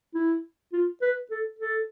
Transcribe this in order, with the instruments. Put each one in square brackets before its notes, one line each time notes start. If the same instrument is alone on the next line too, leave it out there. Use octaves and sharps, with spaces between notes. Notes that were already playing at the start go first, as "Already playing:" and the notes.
[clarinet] E4
F4
B4
A4
A4